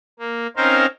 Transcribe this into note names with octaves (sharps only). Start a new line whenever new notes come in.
A#3
C4 C#4 D#4 A#4 C5 F5